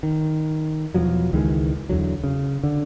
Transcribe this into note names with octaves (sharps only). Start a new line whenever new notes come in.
D#3
E2 B2 F3 F#3
C#2 D#3 E3 G#3
E2 D3 F#3
C#3
D3